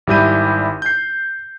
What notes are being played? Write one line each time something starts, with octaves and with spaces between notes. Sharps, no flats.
G#1 G3 E4 G4 G6 D#7
G6 C7